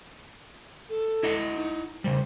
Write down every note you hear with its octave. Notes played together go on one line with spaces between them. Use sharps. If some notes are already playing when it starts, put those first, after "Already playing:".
A4
E4 D#5 F#5
D#4
C#3 G3 C5